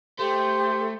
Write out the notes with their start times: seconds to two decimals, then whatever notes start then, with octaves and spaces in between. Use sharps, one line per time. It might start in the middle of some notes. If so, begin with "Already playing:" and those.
0.19 A3 G4 C5